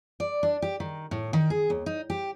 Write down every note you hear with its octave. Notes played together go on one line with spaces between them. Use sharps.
D5
D4
G4
D#3
A2
D#3
G#4
D#2
D#4
G4